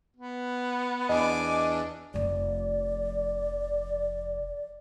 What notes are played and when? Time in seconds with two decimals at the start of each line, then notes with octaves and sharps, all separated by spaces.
0.17 B3
1.09 E2 D4 D#5 G#5 D6
2.14 F1 F2 D5